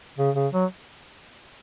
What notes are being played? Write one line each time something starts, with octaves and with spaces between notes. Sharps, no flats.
C#3
C#3
F#3